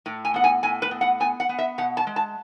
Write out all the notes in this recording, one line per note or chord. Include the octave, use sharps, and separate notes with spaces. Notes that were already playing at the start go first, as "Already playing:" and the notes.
A2
G#5
B3 F#5
G#5
A2 G#5
B4
B3
F#5
B3 G#5
F#5
B3
E5
B2 F#5
A5
G#3
A5